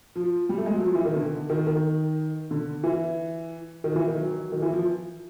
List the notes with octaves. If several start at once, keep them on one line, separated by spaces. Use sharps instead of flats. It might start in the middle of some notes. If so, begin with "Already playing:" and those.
F3
G3
A3
G#3
F#3
F3
E3
D#3
D3
D#3
D#3
D3
E3
D#3
E3
D#3
F#3
D#3
E3
F3